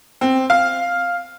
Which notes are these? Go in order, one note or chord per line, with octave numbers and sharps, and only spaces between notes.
C4
F5